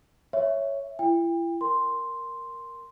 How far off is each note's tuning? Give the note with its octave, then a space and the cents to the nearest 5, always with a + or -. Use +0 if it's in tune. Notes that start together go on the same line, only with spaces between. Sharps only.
C#5 +0 E5 +0
E4 +40 G5 +35
A#4 +0 C6 +0